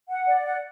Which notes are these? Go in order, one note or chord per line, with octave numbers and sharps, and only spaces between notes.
F#5
D5
F#5